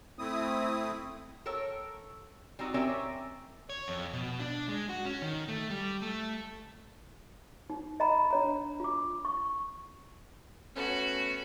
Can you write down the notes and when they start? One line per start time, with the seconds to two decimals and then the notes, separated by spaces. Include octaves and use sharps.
0.19 A3 C4 E4 D#6
1.46 A4 A#4 C#5 G5
2.59 G3 C4 D#4 F#4
2.74 C4 C#4 G4 A#4 D5 E5
3.70 C#5
3.88 F2
4.13 B2
4.40 D4
4.69 G#3
4.89 F#4
5.05 C#4
5.22 D#3
5.48 A3
5.70 G3
6.02 A3
7.70 D#4
8.00 D#5 A#5 B5
8.31 D4 C#5 A#5
8.80 F4 D6
9.25 C#6
10.76 A3 B3 C#4 F#4